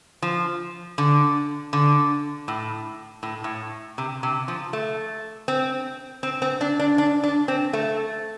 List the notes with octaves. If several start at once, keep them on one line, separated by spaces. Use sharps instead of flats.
F3
D3
D3
A2
A2
A2
C3
C3
F3
A3
C4
C4
C4
D4
D4
D4
D4
C4
A3